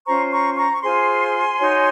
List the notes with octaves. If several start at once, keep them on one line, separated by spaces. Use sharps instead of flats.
C#4 F4 C5 A#5 C#6
A#5 C#6
A#5 C#6
C#6
F4 G#4 C5 G#5 C6
D#4 F#4 C#5